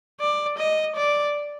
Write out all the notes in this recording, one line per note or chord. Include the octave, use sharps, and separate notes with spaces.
D5
D#5
D5